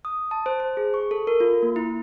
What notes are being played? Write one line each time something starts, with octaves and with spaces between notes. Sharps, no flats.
D#6
A5
C5
C5
G#4
C#6
A4
A#4
F4
A#3
E4